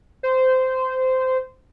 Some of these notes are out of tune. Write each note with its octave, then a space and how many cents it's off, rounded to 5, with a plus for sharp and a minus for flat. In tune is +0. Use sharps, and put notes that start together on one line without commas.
C5 -15